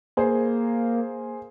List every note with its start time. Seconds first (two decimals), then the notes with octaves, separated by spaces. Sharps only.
0.17 A#3 G#4 C5